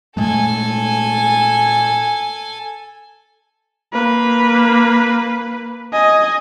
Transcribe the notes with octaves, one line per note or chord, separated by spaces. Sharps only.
A#2 G#3 A3 A4 G#5
A#3 B4
D#5 G#5